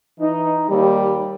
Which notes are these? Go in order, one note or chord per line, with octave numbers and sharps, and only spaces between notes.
E3 D#4
D#2 G3